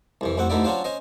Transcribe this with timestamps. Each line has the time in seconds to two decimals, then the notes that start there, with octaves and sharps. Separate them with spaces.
0.21 C2 F2 E3
0.37 A1 F2 C4 F#5
0.50 A1 D2 D3 D#4 E4 D5
0.64 F#3 C#4 D4 F4 C5
0.84 C#4 C5 D#5